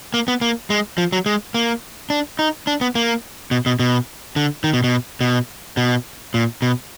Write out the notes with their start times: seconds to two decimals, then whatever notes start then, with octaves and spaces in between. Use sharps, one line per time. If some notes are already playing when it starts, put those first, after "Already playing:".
0.14 A#3
0.28 B3
0.41 A#3
0.70 G#3
0.98 F3
1.12 F#3
1.26 G#3
1.54 A#3
2.10 D4
2.39 D#4
2.67 D4
2.81 B3
2.95 A#3
3.51 B2
3.66 B2
3.79 B2
4.36 D3
4.64 D#3
4.73 B2
4.84 B2
5.21 B2
5.77 B2
6.34 A#2
6.62 B2